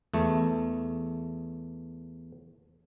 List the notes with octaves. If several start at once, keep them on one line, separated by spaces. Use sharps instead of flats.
E2 A3